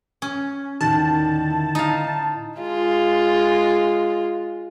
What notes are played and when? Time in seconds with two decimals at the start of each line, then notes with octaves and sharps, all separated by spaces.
0.22 C#4
0.81 D#2 A2 D3 D#3 A5
1.50 E4
1.75 D#4 E4 F5
2.59 G#3 F4